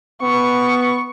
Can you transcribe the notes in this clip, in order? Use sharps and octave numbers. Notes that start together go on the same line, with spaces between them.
B3 C#6